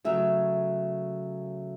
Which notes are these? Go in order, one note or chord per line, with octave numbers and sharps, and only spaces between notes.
C#3 F#3 A3 E5